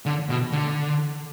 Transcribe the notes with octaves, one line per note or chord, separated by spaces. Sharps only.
D3
B2
D3